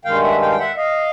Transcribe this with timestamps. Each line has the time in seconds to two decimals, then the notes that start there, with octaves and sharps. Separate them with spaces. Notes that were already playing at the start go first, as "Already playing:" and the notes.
0.05 G2 D#3 G#3 F5 G5
0.23 E5 F#5
0.41 F5 G5
0.51 G5
0.59 E5 F#5
0.77 D#5 F5